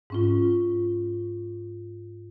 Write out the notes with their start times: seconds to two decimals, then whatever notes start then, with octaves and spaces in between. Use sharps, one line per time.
0.10 G#2 C#4 F4